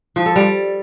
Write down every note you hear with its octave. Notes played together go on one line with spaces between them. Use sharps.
F3
A4
G3